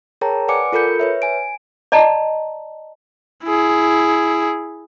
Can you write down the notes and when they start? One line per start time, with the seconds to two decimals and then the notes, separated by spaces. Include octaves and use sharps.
0.21 G#4 A#4 C#5 G5 A5 A#5
0.48 B4 D5 F#5 G#5 D6 C#7
0.72 F4 A4 A#4 B5 G6 C#7
1.00 B4 C#5 E5
1.22 G#5 D7
1.92 D5 D#5 A5 A#5
3.44 E4 G#4